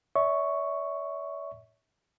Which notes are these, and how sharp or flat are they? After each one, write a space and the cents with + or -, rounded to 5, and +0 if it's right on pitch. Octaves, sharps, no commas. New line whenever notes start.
C#5 +45 E5 -30 C#6 +0